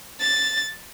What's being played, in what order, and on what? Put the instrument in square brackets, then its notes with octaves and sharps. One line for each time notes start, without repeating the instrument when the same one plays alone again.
[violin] A6